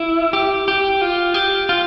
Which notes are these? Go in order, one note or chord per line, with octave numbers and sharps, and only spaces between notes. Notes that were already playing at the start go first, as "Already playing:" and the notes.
Already playing: E4
G4
G4
F4
G4
F4